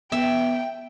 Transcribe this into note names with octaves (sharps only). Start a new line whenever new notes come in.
B3 E5 G5